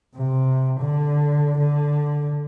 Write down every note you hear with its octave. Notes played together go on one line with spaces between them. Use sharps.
C3
D3
D3